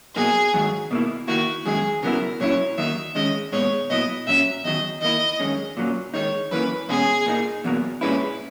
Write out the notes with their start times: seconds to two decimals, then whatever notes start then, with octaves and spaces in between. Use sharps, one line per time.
0.15 B2 F#3 A#3 D#4 G#4
0.54 G#2 D#3 F#3
0.91 B2 A#3 E4
1.28 D#3 A#3 E4 F#4
1.66 F#2 D#3 G#3 G#4
2.03 C#3 F#3 B3 E4 A#4
2.40 A#2 F#3 C#4 E4 C#5
2.78 D#3 F#3 A#3 D#4 E5
3.15 D#3 G#3 C#4 D#5
3.52 A#2 G#3 B3 D#4 C#5
3.90 A#2 F#3 B3 E4 D#5
4.27 A#2 F#3 C#4 E5
4.64 E2 D#3 F#3 D#5
5.01 D#3 A#3 E4 D#5
5.40 F#2 D#3 G#3 C#4
5.77 A#2 F#3 A#3 C#4
6.14 D#3 G#3 D#4 C#5
6.51 F#2 E3 A#3 C#4 B4
6.89 E2 B2 G#3 C#4 G#4
7.26 A#2 A#3 D#4
7.64 E2 B2 F#3 A#3
8.01 A#2 G#3 C#4 E4 B4